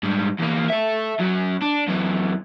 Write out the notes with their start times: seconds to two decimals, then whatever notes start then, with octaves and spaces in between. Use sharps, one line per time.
0.03 G#2 G3
0.39 E2 A#3
0.69 A4 E5
1.19 F#2 F#3
1.62 D4
1.88 F#2 E3